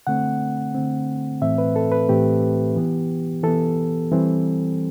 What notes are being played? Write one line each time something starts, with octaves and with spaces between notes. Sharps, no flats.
D3 A3 C4 F#5
D3 A3 C4
A2 E3 A3 C4 E5
B4
A4
B4
A2 E3 A3 C4 G4
E3 B3
E3 B3 A4
E3 G3 C4